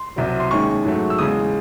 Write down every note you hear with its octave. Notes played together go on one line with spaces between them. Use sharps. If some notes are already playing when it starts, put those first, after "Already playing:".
Already playing: C6
C2 C3 F#3
C6
D#2 D#3 G#3 C#4 C#6
G#2 F#3 A3
E6
E2 C#3 G#3 D#6